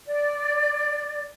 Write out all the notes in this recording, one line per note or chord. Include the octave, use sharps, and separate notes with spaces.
D5